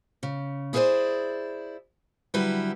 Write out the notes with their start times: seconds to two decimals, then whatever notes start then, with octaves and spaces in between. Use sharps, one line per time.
0.23 C#3
0.73 E4 G#4 A4 B4 C5 D5
2.34 D3 F#3 G3 E4 B4